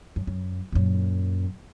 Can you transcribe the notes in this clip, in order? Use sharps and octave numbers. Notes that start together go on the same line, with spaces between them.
F#2
F#2
F#2 A#2